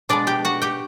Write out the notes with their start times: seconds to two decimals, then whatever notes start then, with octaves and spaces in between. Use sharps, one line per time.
0.09 B2 G#3 B3 D4 D5
0.27 G4 G5
0.45 F#4 F#5
0.62 G4 G5